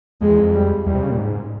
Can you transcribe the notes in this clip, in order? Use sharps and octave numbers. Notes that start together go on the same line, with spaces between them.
F2 G#3
E2
F2
G3
E2 G3
C3
C#3
A#2
G#2